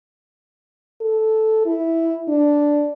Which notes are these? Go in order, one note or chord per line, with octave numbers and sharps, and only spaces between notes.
A4
E4
D4